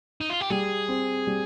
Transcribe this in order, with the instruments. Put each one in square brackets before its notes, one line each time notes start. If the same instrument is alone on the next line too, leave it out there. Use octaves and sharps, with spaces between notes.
[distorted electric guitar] D#4
F4
G4
[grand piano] G3 [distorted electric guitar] G#4
[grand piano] C4
G3